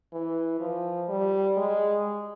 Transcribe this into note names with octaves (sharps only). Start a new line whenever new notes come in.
E3
F3
G3
G#3